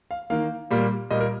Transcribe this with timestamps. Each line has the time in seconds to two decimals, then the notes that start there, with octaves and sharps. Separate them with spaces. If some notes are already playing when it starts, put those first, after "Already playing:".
0.11 F5
0.30 D#3 A#3 F5
0.71 A#2 G3 A#3
1.11 A#2 G3 A#3 D#5
1.21 A#4